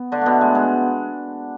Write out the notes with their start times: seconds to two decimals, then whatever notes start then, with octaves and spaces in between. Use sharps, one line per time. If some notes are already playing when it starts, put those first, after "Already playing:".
Already playing: B3
0.12 D3 D4
0.22 B2 A3 B3
0.41 G#3
0.55 G#3